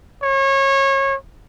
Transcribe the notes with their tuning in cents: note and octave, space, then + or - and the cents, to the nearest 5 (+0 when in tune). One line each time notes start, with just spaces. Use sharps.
C#5 -25